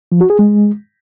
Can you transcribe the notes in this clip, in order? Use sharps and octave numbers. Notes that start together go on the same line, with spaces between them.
F3
F#4
G#4
G#3